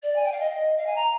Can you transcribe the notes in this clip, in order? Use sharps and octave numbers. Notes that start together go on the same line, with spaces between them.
D5
G#5
G5
F5
D#5
F5
G#5
A#5